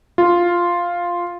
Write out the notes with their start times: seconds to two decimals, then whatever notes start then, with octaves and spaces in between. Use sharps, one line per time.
0.18 F4